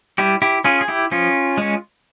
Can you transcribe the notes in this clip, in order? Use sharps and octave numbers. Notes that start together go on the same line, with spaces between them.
G3 E4 G4
E4 G4
C#4 F4 G#4
G#4
E4 G4
F3 C#4 F4
G#3 C#4